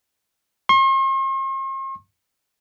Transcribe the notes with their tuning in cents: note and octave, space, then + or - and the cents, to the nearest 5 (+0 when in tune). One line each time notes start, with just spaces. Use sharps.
C6 +45